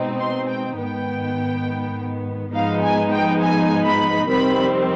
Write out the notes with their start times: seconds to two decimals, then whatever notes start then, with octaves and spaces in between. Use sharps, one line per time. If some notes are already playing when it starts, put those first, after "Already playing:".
Already playing: B2 G#3 C4 D#4
0.20 C6
0.49 G5
0.77 G#2 D#3 B3 G5
2.53 G#2 F3 G#3 B3 D#4 F5
2.82 G#5
3.12 G5
3.41 G#5
3.85 B5
4.28 F2 C3 D#3 G3 C4 B5